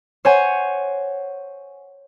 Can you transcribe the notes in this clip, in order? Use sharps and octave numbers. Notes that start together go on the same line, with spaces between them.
C5 C#5 F#5 G#5